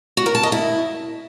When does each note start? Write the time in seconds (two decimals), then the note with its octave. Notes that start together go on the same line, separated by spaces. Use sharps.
0.17 F#4
0.26 A#4
0.35 A5
0.43 D#5
0.52 E4